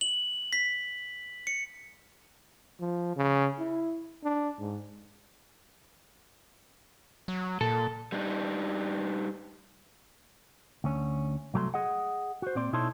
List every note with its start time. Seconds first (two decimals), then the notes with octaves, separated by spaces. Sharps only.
0.01 F#7
0.53 B6
1.47 C#7
2.80 F3
3.16 C#3
3.59 E4
4.24 D4
4.59 G#2
7.28 F#3
7.61 A#2 A4
8.12 G3 D4 D#4
10.84 D2 C#4
11.54 C2 F#3 A3 A#5 C6
11.74 G#4 D#5 F#5
12.42 F#4 C5
12.55 A#2 C4 D5 C6
12.73 B2 D#4 E4 A4 C#5 C6